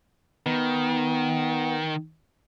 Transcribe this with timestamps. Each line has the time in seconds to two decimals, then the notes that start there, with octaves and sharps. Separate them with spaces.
0.46 D#3 B3